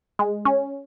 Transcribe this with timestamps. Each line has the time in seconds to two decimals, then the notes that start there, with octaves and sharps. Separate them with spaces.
0.19 G#3
0.45 C#4